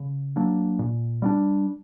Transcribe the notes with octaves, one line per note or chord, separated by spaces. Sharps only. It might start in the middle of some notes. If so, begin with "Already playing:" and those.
Already playing: C#3
F#3 A#3 D4
A#2
G3 A#3 D4